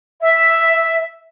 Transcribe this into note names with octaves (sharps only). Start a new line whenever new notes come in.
E5